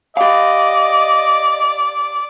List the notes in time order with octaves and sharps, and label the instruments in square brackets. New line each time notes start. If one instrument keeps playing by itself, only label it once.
[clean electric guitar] G4 F5 [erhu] D5 [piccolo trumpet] D#5